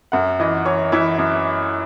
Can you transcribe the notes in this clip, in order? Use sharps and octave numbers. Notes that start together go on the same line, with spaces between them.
F#2 F#5
E3 D#5
E3 C#5
E3 E4
F#2